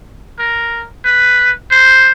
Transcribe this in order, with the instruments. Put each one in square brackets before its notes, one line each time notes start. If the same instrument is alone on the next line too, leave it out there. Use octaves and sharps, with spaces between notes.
[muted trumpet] A#4
B4
C5